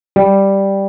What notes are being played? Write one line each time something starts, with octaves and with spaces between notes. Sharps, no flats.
G3